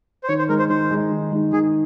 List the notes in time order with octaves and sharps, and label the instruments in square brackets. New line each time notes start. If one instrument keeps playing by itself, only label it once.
[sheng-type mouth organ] C5
[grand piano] D#3 [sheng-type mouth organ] C#5
[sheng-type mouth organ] C5
[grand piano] G#3 D#4 [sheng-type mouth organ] A#4
[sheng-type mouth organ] C5
[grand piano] D#3 [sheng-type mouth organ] C5
[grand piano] G#3 D#4
D#3
G#3 D#4
[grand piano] D#3 [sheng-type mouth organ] G#4